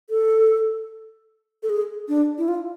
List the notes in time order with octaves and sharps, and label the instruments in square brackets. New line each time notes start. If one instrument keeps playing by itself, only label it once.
[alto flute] A4
A4
G#4
D4
E4
F4